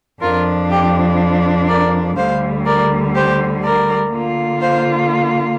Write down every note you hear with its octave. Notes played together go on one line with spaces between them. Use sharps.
F2 F3 D4 F4 A#4
G4
A#4 D5
D2 D3 G3 C5 F5
A#4 D5
G4 C5
A#4 D5
D3 A#3 F4
C5 F5